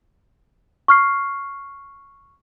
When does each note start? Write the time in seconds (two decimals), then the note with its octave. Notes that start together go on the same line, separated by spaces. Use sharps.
0.88 C#6 F6 C7